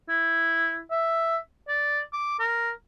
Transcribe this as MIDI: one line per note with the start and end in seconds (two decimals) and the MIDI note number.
0.09 0.81 64
0.91 1.37 76
1.68 2.00 74
2.13 2.38 86
2.39 2.71 70